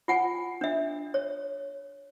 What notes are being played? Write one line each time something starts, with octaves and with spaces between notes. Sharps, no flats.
F4 F#5 G#5
D4 E5
C#5